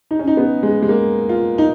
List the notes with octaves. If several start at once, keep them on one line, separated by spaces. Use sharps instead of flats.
D#4
C#4
D#4
B3
G#3
G#3
A#3
F4
D#4